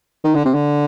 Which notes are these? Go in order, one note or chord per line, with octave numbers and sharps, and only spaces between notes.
D#3
D3
C3
D3